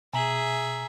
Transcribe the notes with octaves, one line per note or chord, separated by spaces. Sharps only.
B2 G#4 E5 G#5 A#5 F#7